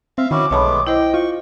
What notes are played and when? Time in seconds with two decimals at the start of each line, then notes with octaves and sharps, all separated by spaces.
0.18 C4 E5 F5
0.31 D#3 C#4 E4 F#4 D6
0.51 B1 G#3 A3 B3 C#5 A5 B5
0.87 E4 C5 D#5 G5
1.14 F4 C#6